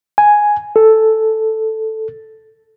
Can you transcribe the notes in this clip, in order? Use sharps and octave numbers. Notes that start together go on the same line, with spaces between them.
G#5
A4